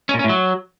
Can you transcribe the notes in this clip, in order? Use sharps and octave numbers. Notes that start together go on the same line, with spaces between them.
C#4
A#2
C#4
A2
F#3